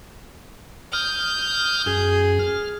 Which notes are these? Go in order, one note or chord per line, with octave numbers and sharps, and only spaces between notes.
D#6 F6 G6
F#2 G#4
F6